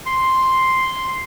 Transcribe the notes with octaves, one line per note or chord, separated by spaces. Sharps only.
C6